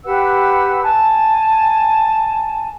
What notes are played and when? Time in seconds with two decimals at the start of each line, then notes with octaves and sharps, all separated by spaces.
0.05 G4 B4 F#5 E6
0.82 G#5 A5